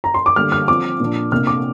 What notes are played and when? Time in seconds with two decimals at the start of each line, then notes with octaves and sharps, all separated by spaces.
0.04 A#5
0.14 C6
0.26 D6
0.36 D3 G3 A#3 D4 F6
0.52 F6
0.68 F3 C4 D6
1.00 A#2 F3 D4
1.32 C3 A#3 D4 F6
1.47 D6